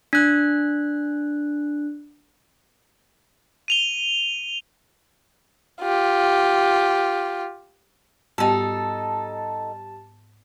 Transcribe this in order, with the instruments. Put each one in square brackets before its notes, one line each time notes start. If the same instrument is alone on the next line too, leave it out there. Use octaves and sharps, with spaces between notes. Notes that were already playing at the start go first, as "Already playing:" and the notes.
[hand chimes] D4 F#6
[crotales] D#7 F7 G7
[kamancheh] F4 G4
[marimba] G#2 B3 G5 [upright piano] G3 [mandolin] D#4 A4 [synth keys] A5